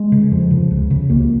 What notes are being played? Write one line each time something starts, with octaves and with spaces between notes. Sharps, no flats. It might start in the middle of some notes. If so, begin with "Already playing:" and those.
Already playing: G#3
C#3
F2 F3
C#3
C#2
C#3
C#2 A#3